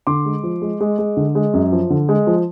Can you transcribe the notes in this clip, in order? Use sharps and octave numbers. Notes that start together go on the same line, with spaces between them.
D3 C6 D6
G#3
F3
G#3
G#3
G#3
D3
G#3
F#2
F3
D3
G#3
F3